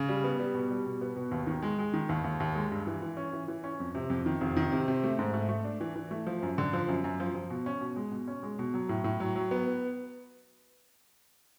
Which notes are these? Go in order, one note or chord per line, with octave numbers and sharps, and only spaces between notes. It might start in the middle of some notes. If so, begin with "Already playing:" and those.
Already playing: C#3
G3
B3
G3
B2
G3
B2
B3
B2
D#2
D#3
G#3
G#3
D#3
D#2
D#2
D#2
G#3
G2
E3
E3
C#4
E3
E3
C#4
F2
C3
F2
D#3
F1
D#3
C3
C3
A3
G#2
A3
A3
D4
E3
E3
A3
F3
F#2
D3
F3
F#2
F#2
F3
F3
B2
C#4
B2
G#3
B2
C#4
G#3
B2
F#3
A2
A2
F#3
F#3
B3